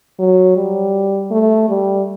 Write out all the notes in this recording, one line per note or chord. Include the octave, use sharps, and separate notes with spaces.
F#3
G3
A3
G3